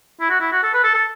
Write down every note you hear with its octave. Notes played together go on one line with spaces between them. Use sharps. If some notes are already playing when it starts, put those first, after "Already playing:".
E4
F#4
E4
F#4
A4
B4
A4
A4